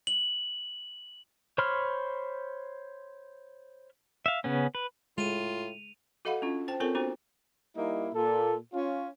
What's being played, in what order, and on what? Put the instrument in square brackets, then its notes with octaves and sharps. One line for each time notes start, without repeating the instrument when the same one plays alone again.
[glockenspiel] F#7
[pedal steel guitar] C5 C#5 B5 C6 F6
E5 F5
C#3 B3 C#4
B4
[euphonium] A2 [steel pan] G#3 [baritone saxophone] F4 [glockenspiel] D#7 F7
[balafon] F#4 A4 D#5 F5 F#5 B5
C#4 D4 F4
C5 G5 A5
C4 F4 A4 A#4 C#5 A5
B3 D4 F#4 C5
[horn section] G3 A#3 D#4 E4
A#2 A4
C#4 F4